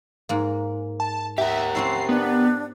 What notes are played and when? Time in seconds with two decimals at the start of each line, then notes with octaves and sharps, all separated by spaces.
0.29 G#2 A#3
1.00 A5
1.38 G4 A#4 E5 F#5
1.75 C4 C#4 E4 C7
2.09 B3 D4